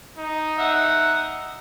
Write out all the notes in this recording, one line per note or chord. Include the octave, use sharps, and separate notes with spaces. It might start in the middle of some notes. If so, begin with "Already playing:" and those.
D#4
E5 F#5